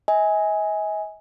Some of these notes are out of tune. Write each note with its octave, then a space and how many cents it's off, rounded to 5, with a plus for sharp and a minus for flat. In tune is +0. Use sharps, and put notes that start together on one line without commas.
D#5 +45 G#5 +0